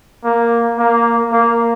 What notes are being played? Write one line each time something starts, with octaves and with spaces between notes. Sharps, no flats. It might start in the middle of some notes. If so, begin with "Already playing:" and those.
A#3
A#3
A#3